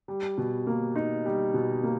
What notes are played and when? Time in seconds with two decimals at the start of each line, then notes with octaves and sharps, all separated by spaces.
0.08 G3
0.38 B2
0.67 A#3
0.96 D#4
1.25 G3
1.54 B2
1.83 A#3